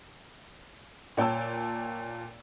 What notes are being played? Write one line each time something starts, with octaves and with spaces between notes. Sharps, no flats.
A#2 C#5 G5 A5 E6